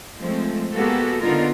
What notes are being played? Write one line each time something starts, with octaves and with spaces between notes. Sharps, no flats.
F3 G#3 A3 C4
G#3 A#3 B3 F#4 G4 A4
D3 B3 D#4 F4 A#4